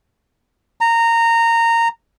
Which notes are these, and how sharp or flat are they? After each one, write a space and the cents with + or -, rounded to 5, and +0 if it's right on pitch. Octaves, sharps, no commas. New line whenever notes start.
A#5 -15